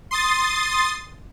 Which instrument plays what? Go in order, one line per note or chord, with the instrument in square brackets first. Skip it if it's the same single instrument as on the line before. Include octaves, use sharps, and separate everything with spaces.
[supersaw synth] C6 D#6 A6